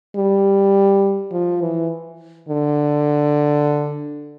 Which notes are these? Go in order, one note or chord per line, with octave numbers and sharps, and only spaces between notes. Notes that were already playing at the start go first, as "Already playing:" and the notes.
G3
F3
E3
D3